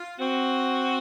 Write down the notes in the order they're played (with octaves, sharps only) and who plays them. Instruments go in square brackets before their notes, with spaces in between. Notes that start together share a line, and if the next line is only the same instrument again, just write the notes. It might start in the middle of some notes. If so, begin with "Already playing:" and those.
Already playing: [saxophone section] F4
[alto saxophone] C4 [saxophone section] F#4